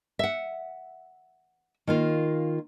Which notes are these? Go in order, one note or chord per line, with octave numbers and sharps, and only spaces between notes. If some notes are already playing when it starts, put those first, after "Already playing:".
E5 F#5
D#3 A#3 F4